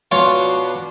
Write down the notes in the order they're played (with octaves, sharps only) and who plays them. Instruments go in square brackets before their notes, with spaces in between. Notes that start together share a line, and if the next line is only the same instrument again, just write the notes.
[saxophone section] B2 D4 F#4 [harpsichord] F4 C#5